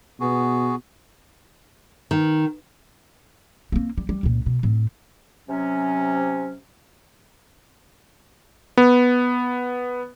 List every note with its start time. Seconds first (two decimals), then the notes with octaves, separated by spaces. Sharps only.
0.20 B2 B3 F#4 G#4
2.11 D#3
3.72 A#3 C4
3.98 G3
4.09 G3
4.23 C#2 A#2
4.46 B2
4.63 A2 C4
5.49 C3 F#3 C#4
8.77 B3